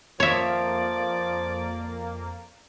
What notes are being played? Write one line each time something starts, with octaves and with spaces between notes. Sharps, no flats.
F2 F3 A#3 C#5 D5 E5